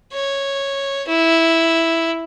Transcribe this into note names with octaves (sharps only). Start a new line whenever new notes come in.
C#5
E4